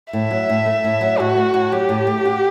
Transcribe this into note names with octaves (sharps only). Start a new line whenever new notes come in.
A2 E5
F#3
A2
A3
A2
F#3
A2 F#4
A3
A2
F#3 G4
A2
A3
F#4